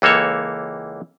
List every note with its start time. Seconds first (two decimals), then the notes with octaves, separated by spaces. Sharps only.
0.02 C#2 E3 A#3 A4 C#5